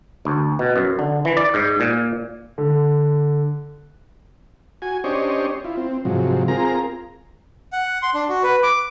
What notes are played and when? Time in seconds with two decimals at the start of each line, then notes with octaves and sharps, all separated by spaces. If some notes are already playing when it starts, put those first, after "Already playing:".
0.25 D2
0.59 B2
0.76 F#2
0.99 D3
1.25 E3
1.37 D5
1.54 G#2
1.80 A#2
2.58 D3
4.82 F#4 G#5
5.04 C#4 D4 G4 C5 C#5 D#5
5.64 E4 F4
5.77 C4
6.05 G#2 C3 F3 F#3
6.48 C4 F4 G#4 A#4 A#5
7.73 F#5
8.02 C6
8.14 D4
8.29 F#4
8.43 B4
8.63 D6